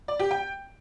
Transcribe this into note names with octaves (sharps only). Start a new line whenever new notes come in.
D5
G4
G5